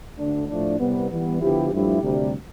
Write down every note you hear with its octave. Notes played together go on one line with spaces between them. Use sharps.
D2 D3 A3 D4
A2 F3 A3 D4
C2 C3 G3 B3
E3 G3 B3
D3 F3 B3 E4 G4
G2 F3 A3 E4 G4
D2 C3 G3